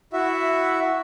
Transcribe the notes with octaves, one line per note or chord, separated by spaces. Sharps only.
E4 F#4 E5